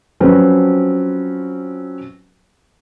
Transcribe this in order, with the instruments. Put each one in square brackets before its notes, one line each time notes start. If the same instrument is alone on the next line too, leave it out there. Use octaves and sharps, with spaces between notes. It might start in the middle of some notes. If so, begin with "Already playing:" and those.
[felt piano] F3 F#3 C4 C#4 F#4 B4